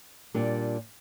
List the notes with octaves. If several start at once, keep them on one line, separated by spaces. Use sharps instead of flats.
A#2 G3 D4